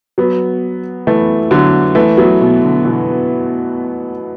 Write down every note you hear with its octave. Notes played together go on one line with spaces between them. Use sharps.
F#3 B3
E3 A3
D3 F#3
E3 A3
F#3 B3
B2
D3
B2 E3